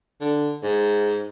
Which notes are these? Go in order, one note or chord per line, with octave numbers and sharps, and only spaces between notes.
D3
G#2